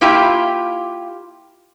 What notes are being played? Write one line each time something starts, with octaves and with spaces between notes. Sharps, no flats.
A#3 E4 F4 G4 G5